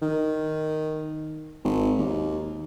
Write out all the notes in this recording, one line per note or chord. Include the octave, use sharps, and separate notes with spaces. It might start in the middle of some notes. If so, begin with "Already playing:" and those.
D#3
G#1
D#2